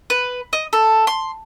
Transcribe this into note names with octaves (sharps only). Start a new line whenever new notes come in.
B4
D#5
A4
C6